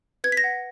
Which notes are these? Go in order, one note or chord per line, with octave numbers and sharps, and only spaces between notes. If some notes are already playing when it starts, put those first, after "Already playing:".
B4 G#6
B6
A#6
F#5